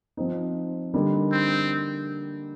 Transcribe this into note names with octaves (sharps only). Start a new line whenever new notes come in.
F3 C4 D#4
D3 G3 A#3 D#4
C4